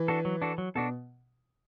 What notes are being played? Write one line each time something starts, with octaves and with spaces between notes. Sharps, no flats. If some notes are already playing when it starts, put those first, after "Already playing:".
Already playing: E3
D4 F#4 A4
F#3
D4 F#4 A4
F#3
B2 D4 F#4 A4